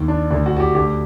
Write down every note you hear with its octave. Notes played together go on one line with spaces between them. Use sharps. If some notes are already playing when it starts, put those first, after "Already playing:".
Already playing: D#2 D#3
D4
D2 D3 D4
F#4
F#4
G4
D2 D3 G4